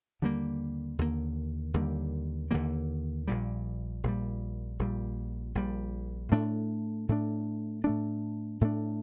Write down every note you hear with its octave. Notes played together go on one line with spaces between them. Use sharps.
D#2 D3 G3 A#3
D#2 D3 G3 A#3
D#2 D3 G3 A#3
D#2 D3 G3 A#3
A#1 A#2 G3
A#1 A#2 G3
A#1 A#2 G3
A#1 A#2 G3
A2 A3 D4
A2 A3 D4
A2 A3 D4
A2 A3 D4